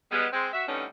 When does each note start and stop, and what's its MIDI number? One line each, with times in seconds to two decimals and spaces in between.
0.10 0.26 55
0.10 0.26 56
0.10 0.26 59
0.32 0.48 56
0.32 0.48 60
0.53 0.63 66
0.53 0.63 76
0.67 0.85 45
0.67 0.85 50
0.67 0.85 55
0.67 0.85 59
0.67 0.85 61
0.67 0.85 63